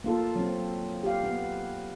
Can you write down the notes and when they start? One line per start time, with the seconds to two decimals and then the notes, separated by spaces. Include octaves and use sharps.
0.04 A#3 F4 A4
0.36 F#3 C4
1.03 G4 F5
1.24 B3